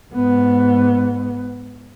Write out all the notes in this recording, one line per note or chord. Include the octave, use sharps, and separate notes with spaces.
G#2 B3